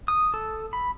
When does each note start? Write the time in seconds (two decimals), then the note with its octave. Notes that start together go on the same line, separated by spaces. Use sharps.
0.08 D#6
0.34 A4
0.73 B5